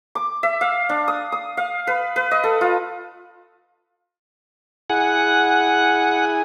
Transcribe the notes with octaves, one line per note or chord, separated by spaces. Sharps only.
D6
E5
F5
D4
D#6
D#6
F5
B4
B4
D#5
A4
F4
E4 G#4 F#5 G#5